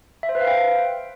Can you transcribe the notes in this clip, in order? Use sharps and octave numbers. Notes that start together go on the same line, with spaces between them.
E5
C5
B4
F5
G5